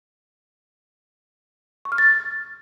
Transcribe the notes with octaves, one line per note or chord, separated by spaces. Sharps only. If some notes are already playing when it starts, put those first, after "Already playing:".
C#6
F6
A6